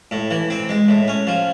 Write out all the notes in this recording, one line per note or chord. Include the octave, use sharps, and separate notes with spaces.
A2
E3
C4
G#3
A2
C#4
F3